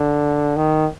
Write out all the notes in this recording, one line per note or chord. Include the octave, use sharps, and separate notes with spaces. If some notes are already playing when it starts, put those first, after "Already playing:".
Already playing: D3
D#3